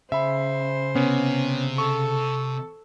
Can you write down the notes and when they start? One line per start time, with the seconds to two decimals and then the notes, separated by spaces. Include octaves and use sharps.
0.12 C#3 C5 E5 B5
0.95 C3 B3 C#4
1.78 A4 C#6